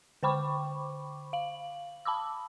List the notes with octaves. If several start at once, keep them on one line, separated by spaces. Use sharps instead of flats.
D3 C5 G5 B5 C#6 D6
F5 F#7
A5 B5 D6 E6